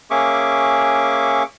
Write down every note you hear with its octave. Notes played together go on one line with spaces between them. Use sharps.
A#3 C#4 G#4 E5 C#6 D6